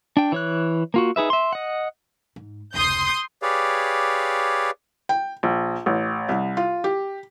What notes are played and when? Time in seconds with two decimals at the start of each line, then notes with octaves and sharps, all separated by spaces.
0.17 D4 G5
0.32 E3 C#5 F#6
0.94 A#3 F4 F#4
1.16 D#4 G#4 B4 E5
1.30 E5 C6
1.53 D#5 F#5
2.36 G#2
2.74 F1 C#2 C6 D#6 G6
3.42 G4 G#4 B4 C#5 D5 F5
5.09 G5
5.43 A#1
5.86 A1
6.29 C2
6.57 F4
6.84 G4